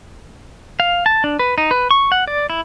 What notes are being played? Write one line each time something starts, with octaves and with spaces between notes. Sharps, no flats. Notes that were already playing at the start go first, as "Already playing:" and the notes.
F5
A5
D4
B4
D#4
B4
C#6
F#5
D5
E4